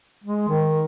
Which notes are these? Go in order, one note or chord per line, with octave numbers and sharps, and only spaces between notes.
G#3
D#3